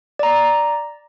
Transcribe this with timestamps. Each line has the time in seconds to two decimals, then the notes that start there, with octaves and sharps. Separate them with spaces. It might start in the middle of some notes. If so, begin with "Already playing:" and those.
0.19 D5 A#5